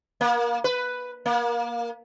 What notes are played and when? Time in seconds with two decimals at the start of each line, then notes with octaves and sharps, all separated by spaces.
0.21 A#3
0.64 B4
1.26 A#3